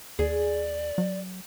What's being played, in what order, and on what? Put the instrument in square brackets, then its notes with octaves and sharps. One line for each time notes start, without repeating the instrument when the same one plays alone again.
[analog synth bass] D#2 [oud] G#4 [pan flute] D5
[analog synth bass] F#3